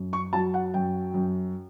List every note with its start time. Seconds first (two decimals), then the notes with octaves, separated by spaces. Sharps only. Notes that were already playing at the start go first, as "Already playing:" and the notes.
Already playing: F#2
0.13 C#6
0.33 F#3 A5
0.54 F#5
0.74 F#2 G5
1.14 F#2